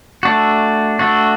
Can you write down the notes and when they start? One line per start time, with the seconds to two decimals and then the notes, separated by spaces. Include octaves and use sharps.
0.23 A3 D4 F#4
0.99 A3 D4 F#4